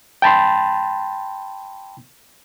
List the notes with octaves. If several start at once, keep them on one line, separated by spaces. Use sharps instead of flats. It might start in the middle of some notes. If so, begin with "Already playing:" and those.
G5 A5 B5 C6